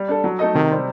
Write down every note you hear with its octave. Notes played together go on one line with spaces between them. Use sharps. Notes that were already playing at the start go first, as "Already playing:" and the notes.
Already playing: G3
D4 A4
F#3
A3 D#4 A4 D#5
C3 D#3
G3 C4